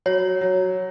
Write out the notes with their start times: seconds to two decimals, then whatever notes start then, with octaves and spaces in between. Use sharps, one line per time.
0.06 F#3 C#5
0.41 F#3